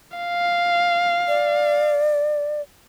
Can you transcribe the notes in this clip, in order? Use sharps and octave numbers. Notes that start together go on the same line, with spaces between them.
F5
D5